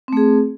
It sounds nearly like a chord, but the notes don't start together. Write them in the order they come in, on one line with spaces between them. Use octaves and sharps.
C4 A3 G#4